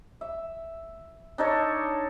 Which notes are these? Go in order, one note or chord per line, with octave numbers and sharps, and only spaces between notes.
E5
D4 D#4 A4 C#5